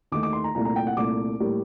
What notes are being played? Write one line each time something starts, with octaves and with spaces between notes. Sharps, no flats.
D#2 D#3 A3 D6
D6
C6
A#5
C2 A#2 A3 A#5
A#5
G5
F#5
C2 A#2 A3 D6
A2 G3 A#3